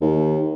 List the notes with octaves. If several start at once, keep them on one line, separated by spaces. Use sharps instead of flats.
D#2